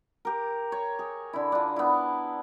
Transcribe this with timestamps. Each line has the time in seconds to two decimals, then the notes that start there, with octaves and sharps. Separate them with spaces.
0.25 G4 A#4
0.72 C#5
0.99 G#4
1.33 D3 E4
1.52 D4 F4
1.76 B3 E4